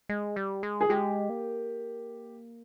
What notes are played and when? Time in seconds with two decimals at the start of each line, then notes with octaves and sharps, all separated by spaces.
0.09 G#3
0.36 G3
0.63 G#3
0.81 G#4
0.89 G#3 G4
1.29 A#3